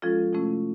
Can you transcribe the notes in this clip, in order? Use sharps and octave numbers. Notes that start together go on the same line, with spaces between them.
F3 G#3 C#4 F4 A4
C3 F3 A3 C#4 E4